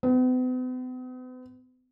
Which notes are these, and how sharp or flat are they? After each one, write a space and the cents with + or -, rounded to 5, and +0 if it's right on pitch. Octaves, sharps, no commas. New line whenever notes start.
B3 +45